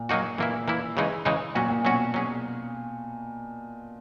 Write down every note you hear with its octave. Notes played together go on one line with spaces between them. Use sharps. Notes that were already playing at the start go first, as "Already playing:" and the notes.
Already playing: A#2
F#3 A#3 D#4 F#4
A#2 E3 A#3 E4
E3 A#3 E4
C#3 E3 G#3 D#4
C#3 E3 G#3 D#4
A#2 F#3 C#4 F#4
A#2
B2 F#3 C#4 F#4
F#3 C#4 G#4